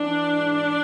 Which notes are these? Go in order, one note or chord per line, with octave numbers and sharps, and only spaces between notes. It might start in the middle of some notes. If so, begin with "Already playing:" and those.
Already playing: E3 D4
G#2